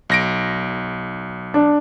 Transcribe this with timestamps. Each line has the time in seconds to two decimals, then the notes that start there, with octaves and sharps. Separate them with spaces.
0.10 B1 A#6 D7
1.54 D4